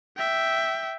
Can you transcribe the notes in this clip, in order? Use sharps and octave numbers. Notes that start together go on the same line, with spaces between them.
E5 G5